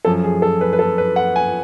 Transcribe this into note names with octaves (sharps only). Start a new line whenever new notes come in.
F#2 F3 A4
G#4
A4
B4
B4
A4
B4
F#5
G#5